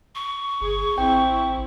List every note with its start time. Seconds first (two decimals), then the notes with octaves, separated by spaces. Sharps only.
0.15 C#6
0.61 G1 G#4
0.98 A1 C4 E4 G5